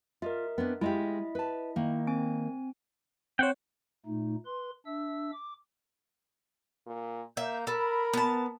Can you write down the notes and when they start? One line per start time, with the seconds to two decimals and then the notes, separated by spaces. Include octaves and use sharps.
0.22 F4 A#4 D#5 E5
0.58 B3 C4 D4
0.81 G#3 E4 F4 G4 D#5 E5
1.35 B4 A5
1.76 D#3 A#3
2.07 C4 G#5 D7
3.39 C4 C5 C#5 F#5 G5
4.06 A#2 A3 D#4
4.46 B4 C6
4.86 D4 E5 E6
5.32 D6
6.86 A#2
7.37 A#3 E5 G6
7.67 A4 A#4 B5
8.13 B3 A5